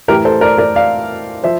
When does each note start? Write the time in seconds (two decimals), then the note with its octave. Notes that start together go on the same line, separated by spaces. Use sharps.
0.08 A2 E3 G4 A#4
0.25 A4 C5
0.41 A#4 D5
0.58 A#4 D5
0.75 D5 F5
1.44 F3 C5 E5